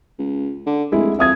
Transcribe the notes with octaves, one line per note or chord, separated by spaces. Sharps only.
C#2
D3
F1 G#3 E4
F2 E5 D#6 G#6